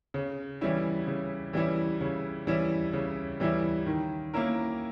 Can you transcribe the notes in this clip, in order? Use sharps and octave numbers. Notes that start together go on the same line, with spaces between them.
C#3
E3 G3 C#4 E4
C#3
E3 G3 C#4 E4
C#3
E3 G3 C#4 E4
C#3
E3 G3 C#4 E4
D#3
A#3 C#4 E4 A#4